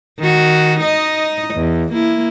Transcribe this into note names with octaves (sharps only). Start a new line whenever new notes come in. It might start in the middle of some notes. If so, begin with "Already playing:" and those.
D#3 F#4
D#4 D#5
E2
A#3 E4